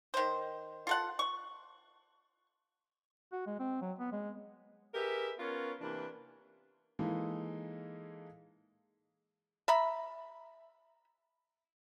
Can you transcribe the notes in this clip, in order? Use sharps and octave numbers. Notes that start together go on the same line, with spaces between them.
D#3 C5
F4 A4 F#5
C#6
F#4
G#3
C4
F#3
B3
G#3
G4 G#4 A#4 B4 D#5 E5
B3 C#4 F4 A#4 C#5
C3 E3 A#3 D4 B4
E3 G#3 A#3 D#4 E4 A4
E5 A#5 B5